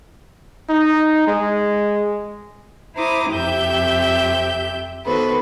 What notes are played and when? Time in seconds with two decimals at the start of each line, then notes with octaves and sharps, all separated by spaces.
0.70 D#4
1.28 G#3
2.96 E4 C5 A#5 D6 D#6
3.31 F2 C3 G4 E5 G6
5.06 D#3 B3 F#4 A4 B4 C5